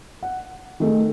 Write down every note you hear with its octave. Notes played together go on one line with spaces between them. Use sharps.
F#5
D#3 A3 G#4